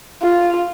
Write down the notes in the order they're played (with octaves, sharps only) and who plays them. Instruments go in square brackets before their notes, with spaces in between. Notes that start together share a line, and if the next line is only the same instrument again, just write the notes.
[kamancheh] F4